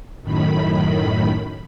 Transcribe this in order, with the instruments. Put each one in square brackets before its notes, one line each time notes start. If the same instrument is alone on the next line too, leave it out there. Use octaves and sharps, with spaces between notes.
[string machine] F#2 A2 D#3 B5